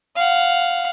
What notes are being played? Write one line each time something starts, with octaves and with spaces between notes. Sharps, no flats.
F5 F#5